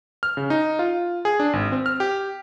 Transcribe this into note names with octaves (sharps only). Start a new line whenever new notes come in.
F6
C#3
D#4
F4
G#4
D4
G#1
C4
F6
G4